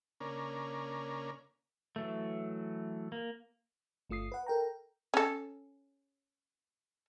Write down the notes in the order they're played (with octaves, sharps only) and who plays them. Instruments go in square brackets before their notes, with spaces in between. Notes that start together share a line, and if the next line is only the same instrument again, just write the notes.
[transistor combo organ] C#3 A#3 C#4 D4 A#4
[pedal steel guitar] E3 F#3 A3
A#3
[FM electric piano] G1 A3 F4 D#6 C7
B4 F#5
A4 A#4 G5 A#5
[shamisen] C#4 A4